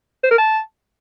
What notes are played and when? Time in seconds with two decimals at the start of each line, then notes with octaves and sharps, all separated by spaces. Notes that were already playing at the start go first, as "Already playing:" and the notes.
0.24 C5
0.31 A#4
0.38 A5